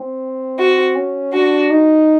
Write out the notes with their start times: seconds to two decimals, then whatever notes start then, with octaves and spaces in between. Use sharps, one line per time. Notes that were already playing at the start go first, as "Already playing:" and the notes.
Already playing: C4
0.58 F#4
0.95 C#4
1.33 D4 F#4
1.70 D#4